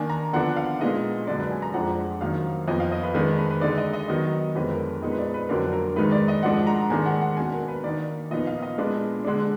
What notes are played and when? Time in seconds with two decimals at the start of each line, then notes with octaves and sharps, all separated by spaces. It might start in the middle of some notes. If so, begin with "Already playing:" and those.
Already playing: D#3 A#3 D4 G#5
0.10 A#5
0.33 D3 F3 B3 D4 F#5
0.56 F5
0.80 A#2 G#3 B3 D#4 D#5
1.27 F#2 D3 G#3 D4 D5
1.39 B4
1.51 G#5
1.62 A#5
1.74 F2 F3 G#3 D4 F#5
2.21 F#2 D#3 A#3 D#4 F5
2.68 F2 F3 B3 D#5
2.80 F5
2.92 D#5
3.03 B4
3.15 D#3 G#3 D4 B4
3.38 B4
3.50 B4
3.61 D3 G#3 D#4 D5
3.78 D#5
3.93 D#5
4.08 D#3 F#3 B3 D#5
4.55 F2 D3 G#3 B3 D4 B4
4.71 A#4
5.02 A#2 G#3 B3 D#4 D#5
5.12 B4
5.18 D5
5.34 B4
5.49 F2 D3 F#3 A#3 D4 A#4
5.73 A#4
5.96 G#2 D#3 G#3 D#4 B4
6.12 D5
6.28 D#5
6.43 G#2 F3 G#3 D4 F#5
6.67 A#5
6.90 G#2 D#3 G#3 D4 G#5
7.06 F#5
7.21 F#5
7.37 B2 A#3 D4 G#5
7.52 A#4
7.68 B4
7.84 D#3 A#3 D#4 D5
8.30 A#2 F3 B3 D#4 D#5
8.47 F5
8.63 D#5
8.78 A#2 G#3 B3 D4
9.25 D3 G#3 D4